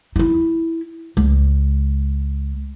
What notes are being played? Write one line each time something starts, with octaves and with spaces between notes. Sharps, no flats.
D#4 E4
C#2